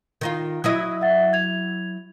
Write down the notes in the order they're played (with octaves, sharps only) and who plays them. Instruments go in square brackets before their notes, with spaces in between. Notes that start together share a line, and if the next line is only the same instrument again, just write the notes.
[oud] D#3 D#4 F4
[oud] F#3 E4 D#5 [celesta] D#6
[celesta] E5 F#5 A6
G#6 F7